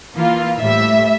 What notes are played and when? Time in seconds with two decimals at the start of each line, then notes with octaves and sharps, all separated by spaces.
0.16 E3 A#3 F4
0.60 A2 G3 E5